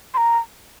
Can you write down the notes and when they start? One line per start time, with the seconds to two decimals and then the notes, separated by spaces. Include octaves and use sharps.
0.14 C6
0.17 A#5